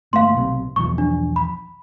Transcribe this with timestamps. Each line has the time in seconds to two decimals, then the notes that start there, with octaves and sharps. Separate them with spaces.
0.13 G1 A3 A#3 F5 C6
0.33 B1 C3
0.76 B1 E2 F3 C#6
0.98 D4
1.36 B5